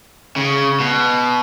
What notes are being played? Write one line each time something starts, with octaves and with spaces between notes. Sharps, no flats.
C#3
B2